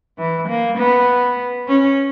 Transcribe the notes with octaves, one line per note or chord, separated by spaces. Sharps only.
E3
A#3
B3
C#4